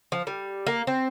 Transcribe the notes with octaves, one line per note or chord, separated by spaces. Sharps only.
F3
G3
A#3
C4